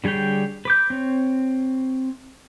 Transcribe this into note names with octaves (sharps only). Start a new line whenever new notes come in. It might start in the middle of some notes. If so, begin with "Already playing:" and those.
D3 G3 G#4 C#5 G5
B4 D6 G6
C4 C#5